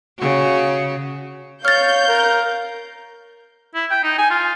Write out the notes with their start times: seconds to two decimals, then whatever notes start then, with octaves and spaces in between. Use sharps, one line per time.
0.19 C#3 F#4
1.65 C#5 F5 F6 G6 A6
2.08 A#4
3.75 E4
3.90 G5
4.03 D#4
4.18 G#5
4.30 F4